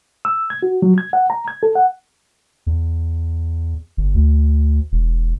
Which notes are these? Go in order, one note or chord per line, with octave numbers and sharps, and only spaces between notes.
E6
G#6
F#4
F#3
G#6
F#5
A#5
G#6
A4
F#5
E2
G1
D2
E1